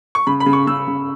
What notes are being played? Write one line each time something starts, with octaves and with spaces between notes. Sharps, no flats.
C#6
C#3 B5
B5
C#3
C#6
C#3 E6
C#3